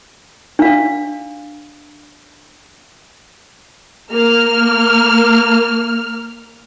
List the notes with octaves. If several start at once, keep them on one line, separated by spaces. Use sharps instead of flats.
D4 F5
A#3 F6